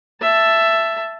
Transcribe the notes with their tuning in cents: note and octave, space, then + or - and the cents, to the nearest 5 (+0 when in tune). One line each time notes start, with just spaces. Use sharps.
E5 +10 A5 +0